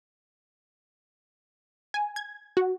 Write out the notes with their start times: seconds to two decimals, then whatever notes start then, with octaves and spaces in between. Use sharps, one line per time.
1.94 G#5
2.16 G#6
2.57 F#4